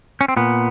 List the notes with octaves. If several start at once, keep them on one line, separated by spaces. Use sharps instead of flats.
C#4
C4
A#2 B3